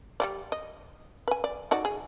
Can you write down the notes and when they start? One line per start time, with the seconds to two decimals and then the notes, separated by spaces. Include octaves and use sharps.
0.20 G3 G#3 D5
0.52 D#5
1.28 B4 G#5
1.44 D5
1.71 D#4 F#4 D5
1.85 G#4